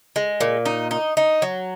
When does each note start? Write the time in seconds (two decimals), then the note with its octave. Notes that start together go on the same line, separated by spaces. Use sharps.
0.16 G#3
0.41 A#2
0.66 D#4
0.91 D#4
1.17 D#4
1.42 F#3